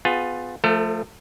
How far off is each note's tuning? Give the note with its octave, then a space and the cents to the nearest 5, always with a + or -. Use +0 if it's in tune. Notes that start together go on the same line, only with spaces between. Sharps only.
B3 +30 F4 +25 G#4 +0
F3 +0 A3 +0 A4 +40